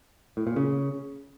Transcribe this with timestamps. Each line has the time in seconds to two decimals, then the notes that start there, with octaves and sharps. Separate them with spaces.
0.37 A2
0.47 A#2
0.56 C#3